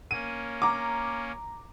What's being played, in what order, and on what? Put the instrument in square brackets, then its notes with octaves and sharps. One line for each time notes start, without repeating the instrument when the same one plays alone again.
[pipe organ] A#3 C#4 [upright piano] D#7
[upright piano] A#5 D6